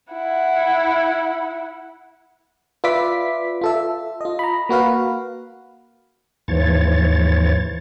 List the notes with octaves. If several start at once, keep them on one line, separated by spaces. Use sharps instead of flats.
E4 F#5
F4 B4 D5 E5 D6 B6
F4 A4 E5
F4 D#5
A#5 B5
A#3 F#4 B4 F5
D#2 G#2 E3 F3 C#5 A6